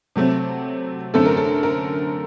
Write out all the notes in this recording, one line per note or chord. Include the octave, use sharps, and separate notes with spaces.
C3 F#3 A3 C4
F#2 D3 A3 C4 A4
A#4
A4
A#4